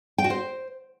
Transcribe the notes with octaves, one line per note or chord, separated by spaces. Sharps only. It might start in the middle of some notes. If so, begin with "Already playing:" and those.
G5
F#4
C5